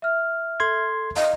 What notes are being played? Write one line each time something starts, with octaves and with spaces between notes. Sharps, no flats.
E5 F6
A4 C6 G#6
D#5 F5